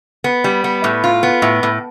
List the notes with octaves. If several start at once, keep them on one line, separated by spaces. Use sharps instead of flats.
B3
G3
B3
A2
F4
B3
A2
A2